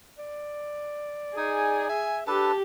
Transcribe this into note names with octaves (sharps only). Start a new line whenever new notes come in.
D5
D#4 G#4 G#5 D#6
E5 G#5
D4 G4 A4 B4 A5